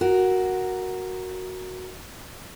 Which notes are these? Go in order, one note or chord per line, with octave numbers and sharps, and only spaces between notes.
F#4 A#4